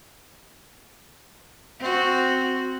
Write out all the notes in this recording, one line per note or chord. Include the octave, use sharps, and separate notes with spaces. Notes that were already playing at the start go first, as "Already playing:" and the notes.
C4 F#4